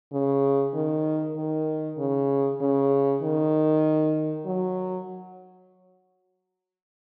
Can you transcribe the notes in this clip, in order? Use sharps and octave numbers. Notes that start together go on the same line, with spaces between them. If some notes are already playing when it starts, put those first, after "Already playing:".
C#3
D#3
D#3
C#3
C#3
D#3
F#3